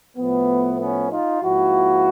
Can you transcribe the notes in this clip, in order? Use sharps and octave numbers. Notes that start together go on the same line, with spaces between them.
A2 F3 A3 B3
B3 C#4
D#4 F4
G#2 F3 A#3 E4 F#4